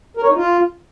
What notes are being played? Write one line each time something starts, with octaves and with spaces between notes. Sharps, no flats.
A#4
C#5
D#4
F4